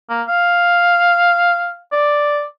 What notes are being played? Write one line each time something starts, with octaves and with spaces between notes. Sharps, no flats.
A#3
F5
D5